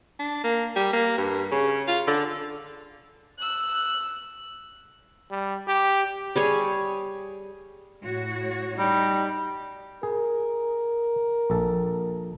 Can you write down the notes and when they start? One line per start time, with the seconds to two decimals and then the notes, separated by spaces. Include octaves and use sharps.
0.19 D4
0.44 A#3
0.76 G3
0.93 A#3
1.18 G2
1.51 C#3
1.87 F4
2.07 D3
3.39 E6 F#6
5.31 G3
5.67 G4
6.36 G3 G#4 C#5
8.02 A2 F#4 C#5
8.79 G3 D#4
10.03 G#4 A#4
11.50 A#1 A4